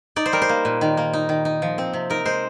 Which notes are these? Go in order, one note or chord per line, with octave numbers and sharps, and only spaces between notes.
D#4 D5
C5
G3 A#4
C5
A#3
A#2
D#3
A#3
D#4
D#3
D#4
F3
C4
C3
D#4 A#4
G#3 C5